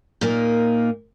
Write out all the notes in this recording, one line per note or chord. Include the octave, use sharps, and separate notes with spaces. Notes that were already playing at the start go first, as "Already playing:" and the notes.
A#2 A#3 D#4